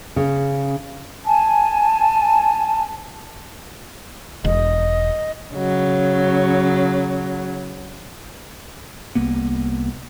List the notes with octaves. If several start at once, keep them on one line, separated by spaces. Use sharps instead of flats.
C#3
G#5 A5
E1 D#5
C#3 F#3
C2 A#3 B3